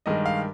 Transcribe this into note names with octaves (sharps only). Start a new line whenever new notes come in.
G2 D#3 G#3 D#5
F5